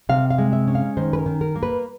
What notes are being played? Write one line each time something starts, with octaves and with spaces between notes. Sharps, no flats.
C3 F5
F5
G#3
E5
C#4
F5
D#3 C5
B4
A#4
D#3
A#4
A#3
B4